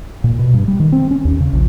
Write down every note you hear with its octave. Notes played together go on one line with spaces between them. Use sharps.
A#2
B2
G2
G3
D#3
C4
C#4
D#2
C#3
A#1